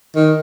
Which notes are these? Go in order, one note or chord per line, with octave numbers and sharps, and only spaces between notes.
D#3